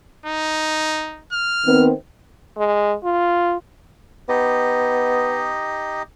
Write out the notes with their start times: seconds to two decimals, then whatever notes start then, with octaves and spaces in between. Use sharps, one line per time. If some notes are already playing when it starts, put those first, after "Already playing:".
0.26 D#4
1.33 F6
1.66 D#3 B3 C4
2.57 G#3
3.04 F4
4.29 B3 D#4 G4 D#5